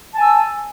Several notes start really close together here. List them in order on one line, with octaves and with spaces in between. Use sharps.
A5 G#5 E6